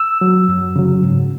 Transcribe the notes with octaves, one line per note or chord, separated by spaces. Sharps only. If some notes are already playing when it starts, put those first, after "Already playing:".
Already playing: E6
F#3
F#2
C#3 F#3
G#2